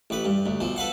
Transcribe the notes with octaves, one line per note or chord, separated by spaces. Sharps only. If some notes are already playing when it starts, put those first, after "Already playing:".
A1 B4
G2
D2
B1 F3
A4 B4 F5 F#5